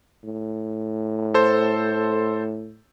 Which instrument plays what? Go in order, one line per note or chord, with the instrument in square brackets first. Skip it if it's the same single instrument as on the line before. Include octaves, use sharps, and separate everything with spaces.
[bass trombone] A2
[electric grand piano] A4 C5